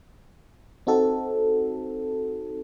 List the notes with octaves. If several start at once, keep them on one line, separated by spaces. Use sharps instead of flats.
C4 D#4 F#4 A4